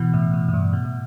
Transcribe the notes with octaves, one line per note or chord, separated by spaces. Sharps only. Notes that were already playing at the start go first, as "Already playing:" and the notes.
Already playing: B2 E3
A2
A2
A2
G2
B2
A2